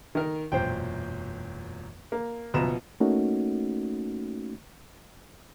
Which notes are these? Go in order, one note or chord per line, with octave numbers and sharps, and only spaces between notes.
D#3 A#4
E1 F#2 A#2 C5 G5
A#3
F#1 B2 F3 A#5 E7
A3 A#3 C#4 D#4 F#4